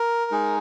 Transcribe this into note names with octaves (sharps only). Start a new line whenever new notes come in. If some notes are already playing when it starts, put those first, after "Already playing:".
Already playing: A#4
G#3 D#4 G#4